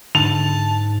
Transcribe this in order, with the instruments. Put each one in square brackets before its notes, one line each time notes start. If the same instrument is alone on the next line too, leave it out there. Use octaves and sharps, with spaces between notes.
[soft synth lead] G#2 [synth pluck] D3 [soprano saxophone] A5 [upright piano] F7